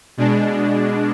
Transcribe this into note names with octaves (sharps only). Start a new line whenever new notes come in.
B2 G#3 D4